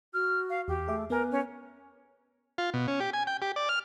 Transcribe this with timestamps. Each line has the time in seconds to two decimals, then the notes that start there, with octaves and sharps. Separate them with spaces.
0.14 F#4 F6
0.50 F5
0.68 E2 G4
0.88 A3 G#4 E5 D6
1.10 B3 A#4 B4 G#5
1.31 C#4
2.58 F4
2.74 B2
2.88 C#4
3.00 G4
3.13 G#5
3.27 G5
3.42 G4
3.56 D5
3.69 F6